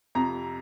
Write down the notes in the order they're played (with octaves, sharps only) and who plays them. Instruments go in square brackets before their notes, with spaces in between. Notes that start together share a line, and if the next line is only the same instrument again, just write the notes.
[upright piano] F2 C3 A#5